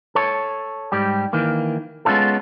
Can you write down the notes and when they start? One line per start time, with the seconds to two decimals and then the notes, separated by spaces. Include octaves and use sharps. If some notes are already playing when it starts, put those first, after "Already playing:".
0.15 A4 C#5
0.92 G#2 G3 G4
1.33 D#3 E3 A#3
2.05 G#3 B3 C#4 D#4 F4 A4